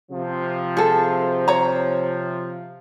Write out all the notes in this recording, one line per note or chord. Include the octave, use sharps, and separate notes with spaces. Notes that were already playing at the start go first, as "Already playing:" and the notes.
C3 F3
G#4 A4
C#5 A#5